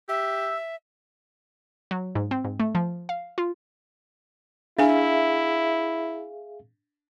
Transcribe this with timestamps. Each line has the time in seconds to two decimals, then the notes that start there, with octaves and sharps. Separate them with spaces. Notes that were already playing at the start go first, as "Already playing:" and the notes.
0.09 G4 E5 E6
1.91 F#3
2.15 G#2
2.31 C4
2.44 G#2
2.60 A3
2.75 F3
3.09 F5
3.38 F4
4.79 D4 E4 G#4 E5 F5 G#5